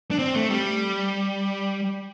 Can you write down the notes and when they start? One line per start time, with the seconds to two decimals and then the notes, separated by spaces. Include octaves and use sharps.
0.11 D4
0.19 C4
0.35 A3
0.50 G3